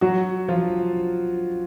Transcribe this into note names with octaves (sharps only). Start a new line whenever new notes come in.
F#3 F#4
F3 F4